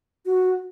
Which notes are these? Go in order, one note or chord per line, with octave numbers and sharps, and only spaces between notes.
F#4